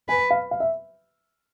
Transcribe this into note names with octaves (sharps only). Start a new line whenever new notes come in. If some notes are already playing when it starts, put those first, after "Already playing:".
B4 G#5
F5
F5
E5